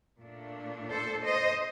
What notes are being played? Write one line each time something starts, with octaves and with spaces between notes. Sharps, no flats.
A#2 A3 D4
A4 C5
C5 D#5